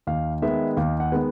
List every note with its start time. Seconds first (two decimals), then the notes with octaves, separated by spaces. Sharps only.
0.07 D#2 F5
0.42 D#3 G#3 B3 E5
0.77 D#2 F5
1.00 F#5
1.12 D#3 G#3 B3